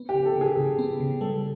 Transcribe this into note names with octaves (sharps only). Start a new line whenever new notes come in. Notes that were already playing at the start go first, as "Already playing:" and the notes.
Already playing: B3
G4
C#3
A4
C#3
G#4
C#3
B3
C#3
G3 A4